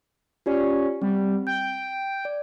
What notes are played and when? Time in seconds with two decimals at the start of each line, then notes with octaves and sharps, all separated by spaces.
0.46 C#4 F4 G4 D5
1.02 G3 C4
1.47 G5 G6
2.25 D5